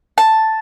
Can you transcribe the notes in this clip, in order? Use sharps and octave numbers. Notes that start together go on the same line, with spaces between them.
A5